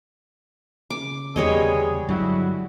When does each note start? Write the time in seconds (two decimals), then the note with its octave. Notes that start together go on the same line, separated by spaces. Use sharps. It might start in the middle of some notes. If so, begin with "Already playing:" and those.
0.90 C#3 D6
1.36 E2 D3 G3 G#3 B3 G#4 C#5 D#5
2.08 G2 D3 F#3 G#3 E4 F#4